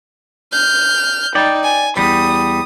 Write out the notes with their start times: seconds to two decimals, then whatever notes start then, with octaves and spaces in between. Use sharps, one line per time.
0.53 F6 G6
1.35 D#4 D5 G5
1.64 G#5
1.97 E2 G3 D#6